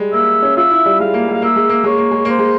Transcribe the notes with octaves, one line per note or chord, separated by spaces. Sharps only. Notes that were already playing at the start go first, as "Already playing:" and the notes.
Already playing: G3 G#3
A#3 E5
C#4
F4 E5
E4
G3
G#3 F5
A#3
G#3
F5
A#3 E5
G#3
A#3
G#3 C#5
A#3
G#3
A#3
C5
G#3